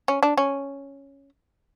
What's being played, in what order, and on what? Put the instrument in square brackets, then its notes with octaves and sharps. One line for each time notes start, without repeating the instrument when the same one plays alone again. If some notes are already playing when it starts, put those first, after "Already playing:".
[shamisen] C#4
D4
C#4